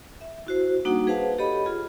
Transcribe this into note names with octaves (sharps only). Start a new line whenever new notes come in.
E5
E4 F#4 C5
G3 A#3 D4 D#4 F#4 F#5
G#4 B4 C5 F5 F#5 A5
G4 A4 C#5 D#5 B5
F4 G#4